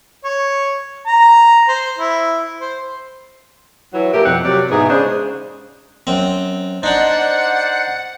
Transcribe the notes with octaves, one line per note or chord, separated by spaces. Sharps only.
C#5
A#5
C5
E4
C5
E3 F#3
A#2 A3 A#3 G4 A#4
F2 B2 G3 C4 F#5
C3 F#3 D5
G#2 B2 E3 B3 G#4
C#3 G#3 D4 G#4 C5
F#2 C4
D4 D#4 C5 D5 F#5